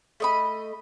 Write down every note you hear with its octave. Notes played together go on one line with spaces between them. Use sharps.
A3 D#5 B5